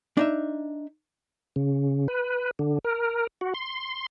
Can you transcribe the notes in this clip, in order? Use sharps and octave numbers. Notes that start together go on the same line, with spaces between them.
D4 D#4 E5
C#3
B4
D3
A#4
F#4
C6